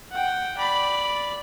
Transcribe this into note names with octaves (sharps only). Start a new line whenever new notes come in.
F#5 G5
D5 B5